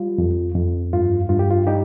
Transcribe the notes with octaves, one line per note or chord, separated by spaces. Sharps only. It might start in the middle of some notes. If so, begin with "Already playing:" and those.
Already playing: G3 F4
F2
F2
G2 F4
G2 F4
G4
F4
G3 D#4 G4